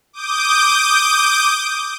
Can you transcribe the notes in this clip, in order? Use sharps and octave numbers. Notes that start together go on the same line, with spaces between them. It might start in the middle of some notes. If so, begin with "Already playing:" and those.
D6 D#6 G6